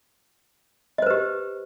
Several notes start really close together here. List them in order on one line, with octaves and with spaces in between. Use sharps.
D#5 C5 B4 G4